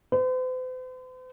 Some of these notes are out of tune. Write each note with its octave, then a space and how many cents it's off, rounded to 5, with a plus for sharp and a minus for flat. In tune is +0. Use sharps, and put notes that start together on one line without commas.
C5 -45